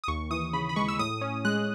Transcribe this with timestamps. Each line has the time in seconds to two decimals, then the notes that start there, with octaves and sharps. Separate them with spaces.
0.04 D#6
0.08 D#2 C#6
0.31 E3 D#6
0.53 C#3 B5
0.69 B5
0.76 G#3 C#6
0.88 E6
0.99 A2 D#6
1.21 C#4
1.45 G#3 F#6